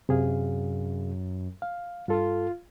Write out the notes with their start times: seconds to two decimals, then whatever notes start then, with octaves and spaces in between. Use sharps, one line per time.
0.09 F#2 C3 G#4 F5
1.62 F5
2.08 G2 F4 A4